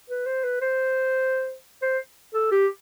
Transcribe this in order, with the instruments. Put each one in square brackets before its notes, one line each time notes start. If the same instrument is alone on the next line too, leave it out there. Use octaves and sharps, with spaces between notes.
[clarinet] B4
C5
B4
C5
C5
A4
G4